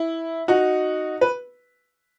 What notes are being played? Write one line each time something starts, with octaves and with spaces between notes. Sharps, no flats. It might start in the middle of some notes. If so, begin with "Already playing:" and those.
Already playing: E4
D#4 F#4
B4